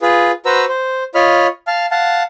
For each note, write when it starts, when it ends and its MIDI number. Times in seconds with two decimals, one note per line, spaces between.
0.02 0.31 65
0.02 0.31 68
0.02 0.31 71
0.46 0.65 66
0.46 0.65 71
0.46 0.65 72
0.46 0.65 82
0.46 0.65 88
0.69 1.04 72
1.15 1.47 65
1.15 1.47 73
1.15 1.47 75
1.15 1.47 83
1.15 1.47 89
1.67 1.86 77
1.67 1.86 81
1.67 1.86 89
1.91 2.23 77
1.91 2.23 78
1.91 2.23 81